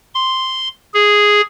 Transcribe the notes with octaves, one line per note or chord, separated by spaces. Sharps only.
C6
G#4